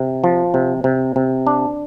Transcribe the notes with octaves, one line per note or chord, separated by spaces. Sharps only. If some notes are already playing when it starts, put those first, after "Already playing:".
Already playing: C3
F3
C3
C3
C3
D4